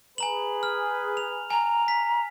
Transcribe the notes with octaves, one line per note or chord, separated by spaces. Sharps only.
G#4 B4 G#5 A#5 F#7
F6
F7
G#5 A#5
B6